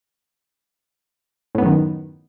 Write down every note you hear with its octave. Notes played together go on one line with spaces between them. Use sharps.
F#2 A2 D#3 B3